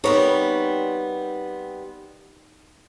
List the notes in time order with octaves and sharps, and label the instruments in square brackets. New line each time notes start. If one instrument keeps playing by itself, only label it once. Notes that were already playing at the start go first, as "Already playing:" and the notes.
[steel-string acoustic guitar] G3 B3 C4 [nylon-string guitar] D#4 A#4 C#5